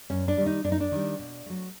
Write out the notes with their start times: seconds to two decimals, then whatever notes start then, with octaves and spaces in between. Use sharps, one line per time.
0.10 F#2 C#4
0.28 D4
0.37 D#3 G3
0.46 D#4
0.64 F#2 D4
0.72 D#4
0.80 D4
0.92 D#3 G3
1.19 B2
1.46 F#3 A3